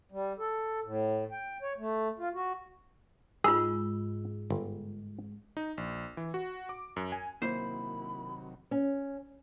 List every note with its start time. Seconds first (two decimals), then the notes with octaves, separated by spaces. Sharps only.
0.12 G3
0.38 A4
0.84 A2
1.32 G5
1.62 C#5
1.78 A3
2.19 F4
2.34 F#4
3.44 G#2 G#3 F4 G#4 B5 E6
4.50 G1
5.57 D#4
5.78 A#1
6.17 E3
6.34 F#4
6.69 D6
6.96 F#2
7.12 G#5
7.42 C3 D#3 F#3 A#3 E4 C5 C#5 B5
8.71 C#4